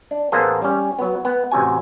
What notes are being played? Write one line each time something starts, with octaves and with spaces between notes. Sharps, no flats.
D4
A1 A#3 B3 G#4 A4 C5
G3 C#4
F#3 B3
B3
A1 C3 F#4 G#5